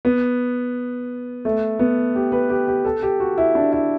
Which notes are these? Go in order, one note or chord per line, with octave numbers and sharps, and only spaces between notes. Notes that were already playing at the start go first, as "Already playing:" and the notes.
B3
A3
B3
G4
B4
G4
G4
A4
G4
F#4
E4
D4
E4